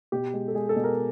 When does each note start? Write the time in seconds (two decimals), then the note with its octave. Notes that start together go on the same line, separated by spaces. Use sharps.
0.12 B2 G4
0.34 G#3
0.48 A4
0.55 G#3 G#4
0.69 A4
0.76 B2
0.84 A#4